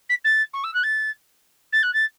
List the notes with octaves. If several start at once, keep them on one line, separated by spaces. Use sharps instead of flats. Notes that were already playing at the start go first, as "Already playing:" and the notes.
B6
A6
C#6
E6
F#6
A6
A6
F#6
A6